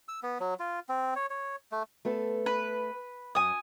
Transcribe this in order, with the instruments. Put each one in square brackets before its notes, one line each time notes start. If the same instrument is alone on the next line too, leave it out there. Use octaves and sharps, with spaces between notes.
[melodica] E6
B3
F#3
F4
C4
C#5
C#5
A3
[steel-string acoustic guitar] A3 B3 A4
[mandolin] B4
[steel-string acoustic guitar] F#2 [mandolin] G#5 D#6